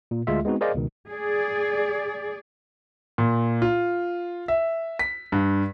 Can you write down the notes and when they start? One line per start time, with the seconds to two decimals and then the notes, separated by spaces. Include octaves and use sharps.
0.11 A#2
0.27 D2 G#3 F4 E5
0.45 G#3 B3 C4 D#4 F#4
0.61 G#4 A#4 C5 D5 D#5 F5
0.75 C#2 B2 D#3
1.10 G#4 D5
3.18 A#2
3.62 F4
4.48 E5
4.99 B6
5.32 G2